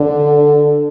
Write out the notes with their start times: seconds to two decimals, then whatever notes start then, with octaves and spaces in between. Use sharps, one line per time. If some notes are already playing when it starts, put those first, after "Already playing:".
Already playing: D3